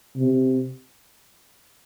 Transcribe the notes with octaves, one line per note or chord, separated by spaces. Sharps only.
C3